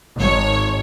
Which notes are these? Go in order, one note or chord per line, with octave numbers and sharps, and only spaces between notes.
G#1 C#5